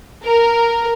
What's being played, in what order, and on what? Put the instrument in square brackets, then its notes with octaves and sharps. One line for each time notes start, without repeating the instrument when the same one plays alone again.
[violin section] A#4